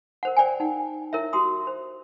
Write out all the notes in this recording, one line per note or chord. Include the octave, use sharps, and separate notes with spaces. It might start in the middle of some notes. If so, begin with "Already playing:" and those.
A#4 C5 F#5
C5 D5 G5 G#5
D#4 F#5
E4 A#4 C#5 E5
F#4 G4 C6 D#6
C5